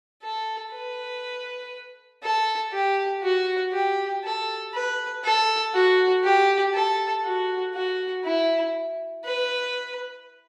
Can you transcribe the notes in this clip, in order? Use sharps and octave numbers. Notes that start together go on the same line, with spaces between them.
A4
B4
A4
G4
F#4
G4
A4
B4
A4
F#4
G4
A4
F#4
F#4
E4
B4